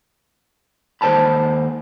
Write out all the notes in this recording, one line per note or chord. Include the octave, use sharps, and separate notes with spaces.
D#2 C5 G#5 A5 B5